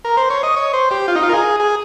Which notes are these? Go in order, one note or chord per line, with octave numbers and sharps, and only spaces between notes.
A#4
C5
C#5
D#5
C#5
C5
G4
F4
D#4
F4
A#4
G#4
G#4